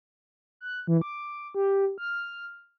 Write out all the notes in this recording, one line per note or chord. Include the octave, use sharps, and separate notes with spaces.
F#6
E3
D6
G4
F6